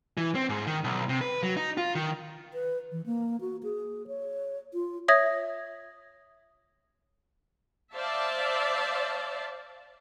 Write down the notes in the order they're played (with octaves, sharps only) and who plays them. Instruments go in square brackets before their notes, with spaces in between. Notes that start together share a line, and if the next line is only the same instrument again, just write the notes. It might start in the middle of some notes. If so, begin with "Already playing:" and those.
[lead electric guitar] E3
C4
G#2
D#3
B1
C3
B4
F#3
D#4
F4
D#3
[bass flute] B4
E3
A#3
F#4
G#4
C#5
F4
[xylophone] C#5 E5 D#6 G#6 A#6
[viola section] C5 D5 E5 F5 A5